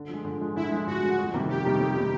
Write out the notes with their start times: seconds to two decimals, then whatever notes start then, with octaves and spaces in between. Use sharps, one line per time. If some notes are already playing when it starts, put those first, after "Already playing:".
Already playing: D3
0.09 F3 G#3
0.25 D3
0.41 F3 G#3
0.56 D3 E4
0.71 F3 G#3
0.87 D3 F#4
1.02 F3 G#3
1.18 F2
1.34 C3 D#3 G3 A#3
1.49 F2 G4
1.65 C3 D#3 G3 A#3
1.81 F2
1.96 C3 D#3 G3 A#3